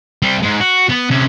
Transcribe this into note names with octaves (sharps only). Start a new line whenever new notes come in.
G3 C4
G#2 G#3
F#4
B3
C3 C#4